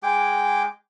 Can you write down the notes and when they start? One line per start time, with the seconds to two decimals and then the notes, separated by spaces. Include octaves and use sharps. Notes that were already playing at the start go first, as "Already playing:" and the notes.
0.03 G#3 G#4 G5 D6